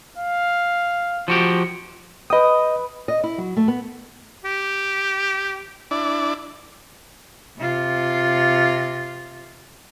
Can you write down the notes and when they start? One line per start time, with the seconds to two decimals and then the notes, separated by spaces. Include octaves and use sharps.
0.18 F5
1.28 F3 F#4 G4
2.30 B4 D#5 G5 D#6
3.08 D#5
3.24 E4
3.38 F#3
3.57 A3
3.68 B3
4.45 G4
5.91 D4 E4 D5
7.59 C3 F4